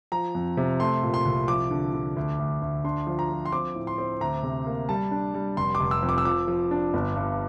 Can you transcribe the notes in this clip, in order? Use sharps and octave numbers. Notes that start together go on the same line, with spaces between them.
F3 A#5
F2
C3
A3 C6
A#2
C6
C2
F3 D6
D3
D3
D2
D2
D2
D4 C6
F3
A#5
F3
C6
C4 D6
A2
C6
C4
D2 A#5
C3
A#3
G3 A5
D4
G3
F1 C6
D6
F1
E6
F2
D6
E6
F3 D6
F3
D4
G1
G2